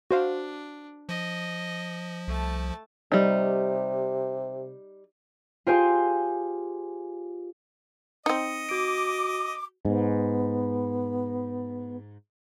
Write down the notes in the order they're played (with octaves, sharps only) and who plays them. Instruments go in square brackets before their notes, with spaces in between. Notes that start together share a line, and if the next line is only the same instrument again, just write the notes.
[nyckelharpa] D4 [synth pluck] F#4 C5 F5
[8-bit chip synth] F3 [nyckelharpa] D#5
[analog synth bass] C2 [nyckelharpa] A3 A5
[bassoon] C3 [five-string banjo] G3 D#4
[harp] F4 G4 G#4 C5 F5 G#5
[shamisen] C4 D#4 [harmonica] D#5 [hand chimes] C#7
[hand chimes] F#4 D7 [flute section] D6
[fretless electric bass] G#2 [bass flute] B3